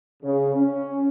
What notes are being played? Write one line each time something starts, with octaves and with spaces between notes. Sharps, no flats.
C#3
C#4